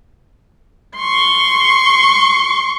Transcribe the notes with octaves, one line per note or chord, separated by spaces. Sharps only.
C6 C#6